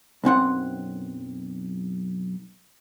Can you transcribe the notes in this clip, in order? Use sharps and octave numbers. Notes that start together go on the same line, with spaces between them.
B1 F#2 C4 F#5